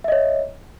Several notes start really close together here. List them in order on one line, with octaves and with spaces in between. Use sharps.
E5 D#5 C#5